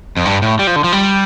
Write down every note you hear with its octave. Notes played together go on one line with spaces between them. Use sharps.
F2
G2
A2
G3
F3
D3
F3
G3